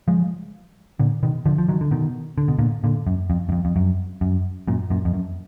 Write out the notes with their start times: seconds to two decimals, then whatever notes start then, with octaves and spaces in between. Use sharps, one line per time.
0.08 F3 G#3
0.99 A#2 D3
1.23 B2 D#3
1.46 D3 F3
1.58 F3
1.68 D#3 F#3
1.81 D3
1.91 B2 D#3
2.38 D3
2.48 B2
2.59 A#2 D3
2.84 A#2 D3
3.07 F#2
3.30 F2
3.49 F#2
3.52 F2
3.65 F2
3.76 F#2
4.21 F#2
4.68 F#2 A#2
4.90 F#2 A#2
5.05 F2
5.14 F#2